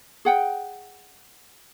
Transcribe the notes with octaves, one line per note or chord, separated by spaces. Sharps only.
G#4 F#5 G5